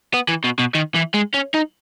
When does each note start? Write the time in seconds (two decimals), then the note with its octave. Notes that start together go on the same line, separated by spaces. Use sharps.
0.14 B3
0.29 E3
0.44 B2
0.59 B2
0.74 D#3
0.94 E3
1.14 G#3
1.34 C#4
1.55 D#4